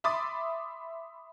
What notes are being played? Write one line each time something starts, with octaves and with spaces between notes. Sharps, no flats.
E5 B5 C6 D6 D#6 A6